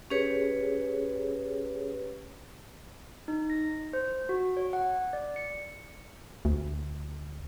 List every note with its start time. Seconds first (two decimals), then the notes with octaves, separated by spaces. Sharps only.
0.10 C#4 G4 G#4 B4 C#5
3.28 D#4
3.50 A#6
3.93 C5
4.29 F#4
4.57 C#5
4.73 F#5
5.13 D5
5.36 C#7
6.45 D2